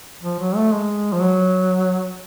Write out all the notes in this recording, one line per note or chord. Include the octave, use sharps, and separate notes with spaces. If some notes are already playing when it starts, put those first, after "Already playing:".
F3
F#3
A3
G#3
F3
F#3